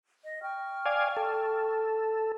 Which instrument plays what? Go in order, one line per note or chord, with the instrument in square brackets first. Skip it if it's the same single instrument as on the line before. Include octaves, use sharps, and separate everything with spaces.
[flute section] D#5
G5 C#6 F6
[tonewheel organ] D5 F5 G#5
A4